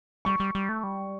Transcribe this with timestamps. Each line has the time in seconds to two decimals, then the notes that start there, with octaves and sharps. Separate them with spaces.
0.25 G3 C#6
0.40 G3
0.55 G3
0.69 A3
0.84 G3